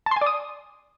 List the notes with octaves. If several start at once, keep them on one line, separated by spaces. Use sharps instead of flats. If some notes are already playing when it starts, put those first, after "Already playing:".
A5
C6
G#5
D5
D#6